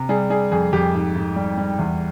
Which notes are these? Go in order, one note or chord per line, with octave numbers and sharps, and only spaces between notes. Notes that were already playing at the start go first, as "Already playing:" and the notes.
Already playing: C3
G3 G#4
G3 G#4
F2 G#4
F2 G4
G#2
G#2
G3
G3
E2